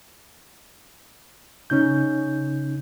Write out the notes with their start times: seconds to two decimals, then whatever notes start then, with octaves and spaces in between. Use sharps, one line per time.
1.70 C#3 C#4 D#4 G6